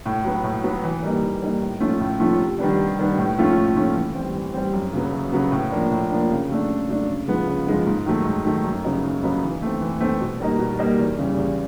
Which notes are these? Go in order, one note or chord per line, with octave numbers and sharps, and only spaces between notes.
A2
F#3 B3
A2
F#3 B3
E3
G3 A#3 D#4
E3
G3 A#3 D#4
A2
F3 A3 C#4 F4
A2
F3 A3 C#4 F4
C3
D#3 G3 B3 D4
C3
D#3 G3 B3 D4
A2
F3 A3 C#4 F4
A2
F3 A3 C#4 F4
E3
G3 C4
E3
G3 C4
F#2
C#3 F#3 B3
F#2
C#3 F#3 B3
A2
F3 A#3 D4
A2
F3 A#3 D4
C#3
F#3 A3 D4
C#3
F#3 A3 D4
C#3
F3 G#3 B3
C#3
F3 G#3 B3
G#2
D#3 F#3 A3
G#2
D#3 F#3 A3
F#2
C#3 F#3 B3 D#4
F#2
C#3 F#3 B3 D#4
E3
A3 C4
E3
A3 C4
B2
G3 A#3 D#4
B2
G3 A#3 D#4
E2
C#3 E3 G3
E2